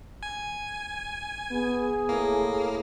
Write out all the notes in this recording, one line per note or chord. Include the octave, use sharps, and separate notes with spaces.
G#5
B3 G#4
A2 A#3